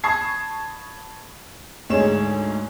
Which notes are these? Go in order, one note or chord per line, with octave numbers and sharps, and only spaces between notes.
A5 B5 C#6 D#6 G#6 C7
D2 G#2 D#4 G#4 C#5 E7